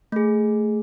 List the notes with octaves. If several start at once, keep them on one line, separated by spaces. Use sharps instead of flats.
A3 G#4